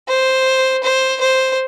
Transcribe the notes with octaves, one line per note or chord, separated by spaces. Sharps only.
C5
C5
C5